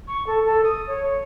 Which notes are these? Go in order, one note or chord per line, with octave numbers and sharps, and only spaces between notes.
C#6
A4
A4
D#6
C#5